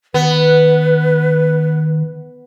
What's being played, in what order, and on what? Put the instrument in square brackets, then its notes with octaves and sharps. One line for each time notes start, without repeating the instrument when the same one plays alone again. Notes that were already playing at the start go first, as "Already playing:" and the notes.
[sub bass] D#3 [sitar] B3 [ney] B4